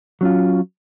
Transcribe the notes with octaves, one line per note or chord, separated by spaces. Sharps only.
F#3 C#4 F4